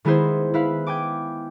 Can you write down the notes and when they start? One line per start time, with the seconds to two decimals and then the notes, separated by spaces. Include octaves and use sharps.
0.05 D#3 G#3 B3 E4 G#4 C5
0.54 E4 B4 F5
0.87 G5 G#5 D6